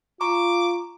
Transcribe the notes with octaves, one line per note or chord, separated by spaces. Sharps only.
F4 A#5 C#6 D6